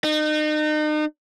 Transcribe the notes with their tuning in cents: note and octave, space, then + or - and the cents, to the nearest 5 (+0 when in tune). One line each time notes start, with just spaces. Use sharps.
D#4 -35